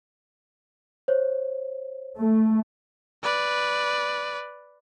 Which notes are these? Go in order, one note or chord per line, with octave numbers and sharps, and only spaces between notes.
C5 C#5
A3
B4 D5